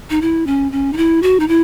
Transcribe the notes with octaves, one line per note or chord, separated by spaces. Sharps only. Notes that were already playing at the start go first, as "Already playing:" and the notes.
D#4
E4
C#4
C#4
D#4
E4
F#4
D#4
E4